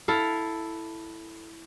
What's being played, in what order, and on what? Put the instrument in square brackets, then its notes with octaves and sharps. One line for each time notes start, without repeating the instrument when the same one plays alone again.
[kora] E4 A4 F5